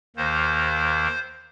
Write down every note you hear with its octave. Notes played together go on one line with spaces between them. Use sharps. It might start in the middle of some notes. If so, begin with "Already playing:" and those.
D#2 D#3 A#3 C5